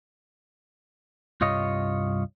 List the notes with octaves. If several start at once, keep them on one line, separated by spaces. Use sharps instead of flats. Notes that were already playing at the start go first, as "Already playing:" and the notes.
C2 G2 F4 C#5 D#5